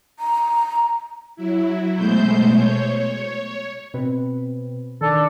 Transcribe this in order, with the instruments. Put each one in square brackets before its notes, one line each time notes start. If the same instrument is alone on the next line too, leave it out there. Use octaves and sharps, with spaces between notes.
[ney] A#5
[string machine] F#3 E4
B2 G#3 A3 C5 G6
C#5
[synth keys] B2 C4 B4
[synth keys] D#3 [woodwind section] D4 A4